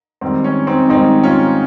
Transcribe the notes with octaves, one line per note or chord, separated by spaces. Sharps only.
G#2 D#3 G3 C4
C#4
C4 D#4
G#2 D#3 G3 C4 D#4
C#4 F4